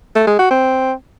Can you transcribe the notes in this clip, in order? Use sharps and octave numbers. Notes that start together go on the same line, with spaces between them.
A3
G#3
F#4
C4